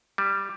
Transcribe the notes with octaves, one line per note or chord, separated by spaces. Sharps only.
G3